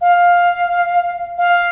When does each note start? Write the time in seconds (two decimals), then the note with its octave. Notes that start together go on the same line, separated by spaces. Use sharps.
0.01 F5
1.38 F5